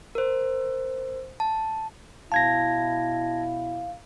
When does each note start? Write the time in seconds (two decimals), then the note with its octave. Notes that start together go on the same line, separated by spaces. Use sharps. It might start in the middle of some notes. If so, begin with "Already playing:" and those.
0.15 A#4 C5
1.40 A5
2.32 B2 E4 F5 A5 G#6 A#6